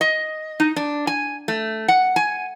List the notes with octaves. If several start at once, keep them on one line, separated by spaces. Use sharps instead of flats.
D#5
D#4
D4
G#5
A3
F#5
G#5